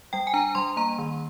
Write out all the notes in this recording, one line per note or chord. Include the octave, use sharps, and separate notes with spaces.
G3 G5
G#5
D4 A#5
G3 C6
A#3 A#5
D#3